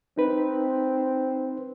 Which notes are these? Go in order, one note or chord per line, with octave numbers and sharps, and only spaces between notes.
C4 D#4 B4